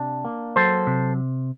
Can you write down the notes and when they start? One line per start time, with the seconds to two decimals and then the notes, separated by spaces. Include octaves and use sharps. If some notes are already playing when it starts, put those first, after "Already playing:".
Already playing: C3 D4
0.25 A#3
0.56 F#3 A4 C5
0.87 C3